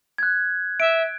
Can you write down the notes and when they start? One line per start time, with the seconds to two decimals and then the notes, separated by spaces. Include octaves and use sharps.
0.18 F#6 G#6
0.80 E5 D7